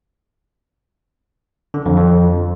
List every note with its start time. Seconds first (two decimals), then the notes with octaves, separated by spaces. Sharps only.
1.74 D3
1.86 F2
1.97 F2